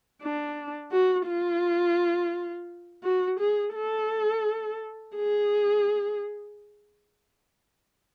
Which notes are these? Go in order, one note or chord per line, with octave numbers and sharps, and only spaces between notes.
D4
F#4
F4
F#4
G#4
A4
G#4